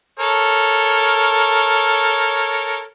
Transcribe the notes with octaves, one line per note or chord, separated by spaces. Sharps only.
A4 A#4 C#5